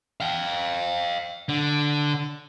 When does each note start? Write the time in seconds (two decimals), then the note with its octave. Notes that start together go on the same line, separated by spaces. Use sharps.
0.20 F5 G5
1.49 D3